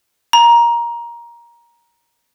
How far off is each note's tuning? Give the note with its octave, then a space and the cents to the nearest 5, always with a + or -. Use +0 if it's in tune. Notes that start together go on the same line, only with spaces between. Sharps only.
A#5 +15